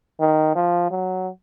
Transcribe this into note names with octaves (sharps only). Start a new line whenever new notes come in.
D#3
F3
F#3